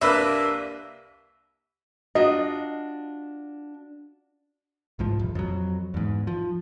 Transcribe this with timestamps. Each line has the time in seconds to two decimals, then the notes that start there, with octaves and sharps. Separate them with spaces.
0.01 C2 A#3 D4 B4 E5 E6
2.15 D4 F4 F#4 D#5
4.99 C2 G#2 F3
5.19 D#1
5.35 F2 F#3
5.94 E2 G#2
6.27 F3